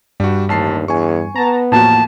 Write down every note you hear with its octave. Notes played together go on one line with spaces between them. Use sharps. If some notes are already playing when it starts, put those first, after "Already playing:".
G2 G3 F#4
A1 D#2 A5 C7
E2 G#5 C#6
B3 A5 A#5
E2 A2 F3 A#3 F#4 A5